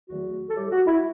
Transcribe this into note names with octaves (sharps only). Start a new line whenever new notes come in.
E2 D#3 F#3 A3 F#4
A4
A2 G3 G4
F#4
E4